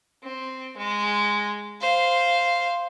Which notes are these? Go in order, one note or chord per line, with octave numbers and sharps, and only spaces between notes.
C4
G#3
C5 F5